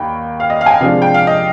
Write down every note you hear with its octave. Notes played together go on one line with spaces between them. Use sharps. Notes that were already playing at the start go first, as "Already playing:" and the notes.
Already playing: D#2 D#3 G5 B5
F5
D#5
F5
G#5
G5
C3 F3 G#3 D4 F5
G5
F5
D#5